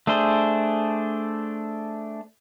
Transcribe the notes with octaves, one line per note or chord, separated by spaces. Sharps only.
A3 D4 G#4 C5